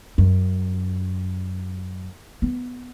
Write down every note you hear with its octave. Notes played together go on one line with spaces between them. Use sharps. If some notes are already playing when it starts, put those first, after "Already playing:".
F#2
B3